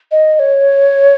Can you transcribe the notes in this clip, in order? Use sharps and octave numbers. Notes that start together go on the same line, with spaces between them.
D#5
C#5